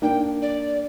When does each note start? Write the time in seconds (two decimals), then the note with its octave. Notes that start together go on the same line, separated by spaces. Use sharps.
0.02 A#3 D4 G5
0.42 D5